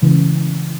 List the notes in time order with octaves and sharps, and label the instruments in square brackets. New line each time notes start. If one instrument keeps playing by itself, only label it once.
[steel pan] C#3 E3 G#3